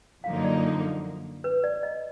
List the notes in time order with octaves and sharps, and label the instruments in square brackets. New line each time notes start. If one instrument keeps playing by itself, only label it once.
[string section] F#2 D3 F3 A#3 D#4 [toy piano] F5
[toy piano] D#5
D5
B4
D5
D#5